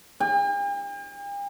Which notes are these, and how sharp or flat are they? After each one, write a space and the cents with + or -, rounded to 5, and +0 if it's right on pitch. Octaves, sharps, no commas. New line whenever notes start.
G5 +45